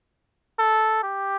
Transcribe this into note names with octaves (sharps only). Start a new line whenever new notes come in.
A4
G4